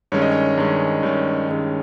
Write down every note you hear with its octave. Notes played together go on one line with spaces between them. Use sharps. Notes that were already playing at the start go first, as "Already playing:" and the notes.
G2 D#3 G#3 C#4 C#5
D#5
C#5
G2 D#3 G#3 C#4
G2 D#3 G#3 C#4 C#5
G2 D#3 G#3 C#4